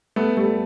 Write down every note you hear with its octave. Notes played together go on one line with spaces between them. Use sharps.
A3 B3
G3 A3